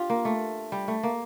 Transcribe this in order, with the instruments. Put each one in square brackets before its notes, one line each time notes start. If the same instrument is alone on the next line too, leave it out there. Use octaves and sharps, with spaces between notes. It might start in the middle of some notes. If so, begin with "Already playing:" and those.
Already playing: [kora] D4 F4 G4
A#3
A3
G3
A3
A#3